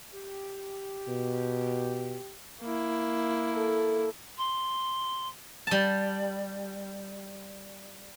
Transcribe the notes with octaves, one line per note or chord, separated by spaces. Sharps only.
G4
B2
A#3 E4
A4
C6
G3 A5